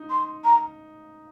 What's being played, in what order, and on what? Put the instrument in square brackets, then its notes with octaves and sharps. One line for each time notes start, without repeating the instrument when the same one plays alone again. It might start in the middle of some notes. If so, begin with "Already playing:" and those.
Already playing: [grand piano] D#4
[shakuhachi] C6
A#5